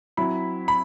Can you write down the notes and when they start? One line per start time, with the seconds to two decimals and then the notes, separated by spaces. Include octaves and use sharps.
0.17 F#3 C4 E4 B5
0.68 B5